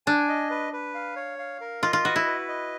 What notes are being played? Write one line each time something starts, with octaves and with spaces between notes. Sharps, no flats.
D4 G#5
D#5
B4
B4
F5
C#5
F5
A#4
F4 D#5
F4
F#4 B4
E4
B4
D#5